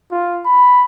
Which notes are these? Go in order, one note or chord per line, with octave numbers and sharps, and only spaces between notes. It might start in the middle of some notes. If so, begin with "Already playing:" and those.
F4
B5